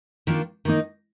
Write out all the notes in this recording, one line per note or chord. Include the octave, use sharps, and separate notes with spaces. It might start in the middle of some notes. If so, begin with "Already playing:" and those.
D#3 A#3 D4 F4
D#3 A#3 D#4